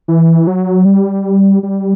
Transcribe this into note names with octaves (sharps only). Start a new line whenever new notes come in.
E3
F#3
G3
G3